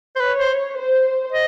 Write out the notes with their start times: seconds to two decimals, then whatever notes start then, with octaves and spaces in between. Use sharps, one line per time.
0.16 C5
0.20 B4 C#5
0.39 C5
0.76 C5
1.32 D#5